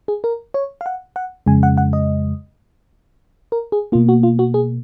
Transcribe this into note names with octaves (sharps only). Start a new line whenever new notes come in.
G#4
A#4
C#5
F5
F#5
F#5
F2 C#3 G#3 G#5
F#5
F#5
D#5
A#4
G#4
B2 A#3 F4
F#4
F4
F#4
G#4